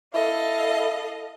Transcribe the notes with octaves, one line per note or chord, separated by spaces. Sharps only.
E4 A4 D#5 F5